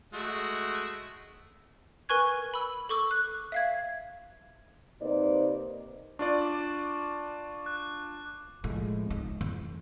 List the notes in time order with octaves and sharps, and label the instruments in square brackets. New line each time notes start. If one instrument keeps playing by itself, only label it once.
[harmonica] G#3 A3 F#4
[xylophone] A#4 B4 G#5 C#6 F#6 G#6
B5 E6
A4 C#6 D6 E6
F#6
E5 F5 G#6
[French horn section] C3 A#3 D#4 B4 C5 D5
[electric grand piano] D4 F4 D5 [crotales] C#6
[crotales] D6
F#6
[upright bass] A2 [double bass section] F3 G#3
[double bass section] C#2 [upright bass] D#4
[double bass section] F1 [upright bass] E3